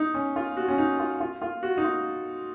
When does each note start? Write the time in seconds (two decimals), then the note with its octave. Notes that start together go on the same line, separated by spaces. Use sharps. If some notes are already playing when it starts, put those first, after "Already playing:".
Already playing: D#4
0.14 C#4
0.36 F4
0.57 F#4
0.68 C#4
0.78 D#4
1.00 F4
1.20 F4
1.42 F4
1.63 F#4
1.77 D#4
1.84 F4